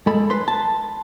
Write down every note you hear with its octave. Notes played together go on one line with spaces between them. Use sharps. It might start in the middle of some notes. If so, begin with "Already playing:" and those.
G#3 A4 B5
B4 C6
A5